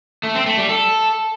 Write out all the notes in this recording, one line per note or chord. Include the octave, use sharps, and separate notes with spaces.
A3
C4
A3
G3
A4